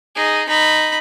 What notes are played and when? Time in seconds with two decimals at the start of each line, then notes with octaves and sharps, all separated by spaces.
0.16 D#4 G#4
0.48 D#4 B5